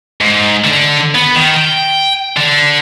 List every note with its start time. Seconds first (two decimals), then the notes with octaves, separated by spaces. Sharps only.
0.21 G#2
0.64 D3
1.15 B3
1.35 D#3
1.57 G5
2.37 D3